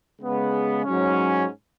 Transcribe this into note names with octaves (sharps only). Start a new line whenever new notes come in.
C#3 G#3 B3
G#2 F#3 C#4